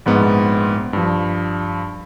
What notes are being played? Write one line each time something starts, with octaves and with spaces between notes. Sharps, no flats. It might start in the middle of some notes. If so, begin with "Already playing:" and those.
A#1 G#2 B3
G2 F3